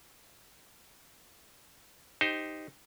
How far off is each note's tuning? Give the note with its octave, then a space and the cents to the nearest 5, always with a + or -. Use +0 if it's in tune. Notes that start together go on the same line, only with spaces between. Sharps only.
D#4 +0 G4 +0 C5 +0